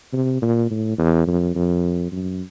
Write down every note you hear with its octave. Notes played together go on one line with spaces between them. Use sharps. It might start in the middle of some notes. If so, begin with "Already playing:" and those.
C3
A#2
A2
E2
F2
F2
F#2